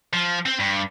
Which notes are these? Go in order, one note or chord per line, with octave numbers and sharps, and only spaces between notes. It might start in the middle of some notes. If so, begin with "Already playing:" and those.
F3
C4
G2